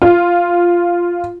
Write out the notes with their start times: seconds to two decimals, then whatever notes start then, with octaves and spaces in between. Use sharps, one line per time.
0.02 F4